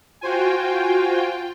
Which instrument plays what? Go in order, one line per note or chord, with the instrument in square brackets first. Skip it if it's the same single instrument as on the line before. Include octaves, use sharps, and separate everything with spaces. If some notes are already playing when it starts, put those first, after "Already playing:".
[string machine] F4 G5 [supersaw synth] F#4 C5 G#5